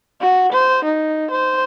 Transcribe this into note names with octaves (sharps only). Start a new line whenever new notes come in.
F#4
C5
D#4
C5